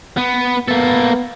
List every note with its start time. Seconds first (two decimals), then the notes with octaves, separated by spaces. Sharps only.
0.17 B3
0.68 A#3 B3 A4